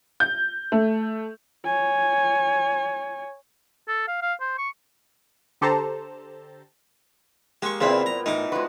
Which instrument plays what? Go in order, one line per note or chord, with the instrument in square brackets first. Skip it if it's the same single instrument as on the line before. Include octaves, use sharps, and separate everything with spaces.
[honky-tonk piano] G6
A3
[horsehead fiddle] C#5 G#5
[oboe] A4
F5
F5
C5
C#6
[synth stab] D3 G4 A4 C5 A5 A#5
[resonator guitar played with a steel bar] G#3 [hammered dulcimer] A#3 [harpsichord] G4 C#6
[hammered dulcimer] A#2 G3 B3 [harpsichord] C#3 C4 [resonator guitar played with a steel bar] E4 B4 C5
[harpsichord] A#5
[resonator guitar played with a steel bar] A2 A#4 [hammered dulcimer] E3 [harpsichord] D#4 D6
[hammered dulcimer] F3 F#4 [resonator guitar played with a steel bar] G#3 B4